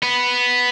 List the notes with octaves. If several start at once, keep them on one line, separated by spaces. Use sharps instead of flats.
B3